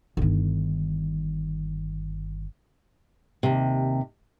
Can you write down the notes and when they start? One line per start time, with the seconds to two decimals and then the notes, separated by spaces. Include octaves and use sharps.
0.17 G1 D#3
3.43 D#2 C3